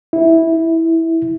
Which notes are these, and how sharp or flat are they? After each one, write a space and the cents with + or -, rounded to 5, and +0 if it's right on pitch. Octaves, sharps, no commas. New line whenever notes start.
E4 -10